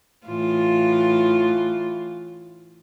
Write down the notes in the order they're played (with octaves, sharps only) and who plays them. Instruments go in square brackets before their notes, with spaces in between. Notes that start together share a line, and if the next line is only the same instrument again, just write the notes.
[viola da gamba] A2 E3 F4